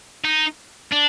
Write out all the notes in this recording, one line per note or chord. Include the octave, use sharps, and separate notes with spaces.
D#4
D4